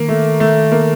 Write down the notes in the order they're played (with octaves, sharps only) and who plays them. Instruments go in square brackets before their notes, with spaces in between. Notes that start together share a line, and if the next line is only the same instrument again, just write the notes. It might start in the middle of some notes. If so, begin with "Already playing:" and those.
Already playing: [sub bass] D#3 [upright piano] A#3
[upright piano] A3
A3
A#3